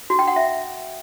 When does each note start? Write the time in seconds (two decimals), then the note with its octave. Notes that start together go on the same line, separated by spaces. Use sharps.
0.10 F#4
0.19 G5
0.27 F#5
0.36 E5